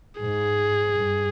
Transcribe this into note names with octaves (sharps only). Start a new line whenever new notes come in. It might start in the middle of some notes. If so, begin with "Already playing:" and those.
G#2 G#4
G2